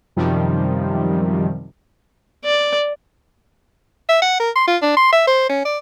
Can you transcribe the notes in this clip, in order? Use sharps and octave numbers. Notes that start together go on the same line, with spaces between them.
F#2 C3 D#3 F3 G3
D5
E5
F#5
A#4
C6
F4
D4
C6
E5
C5
C#4
D5